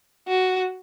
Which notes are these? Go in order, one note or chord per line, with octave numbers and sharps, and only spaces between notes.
F#4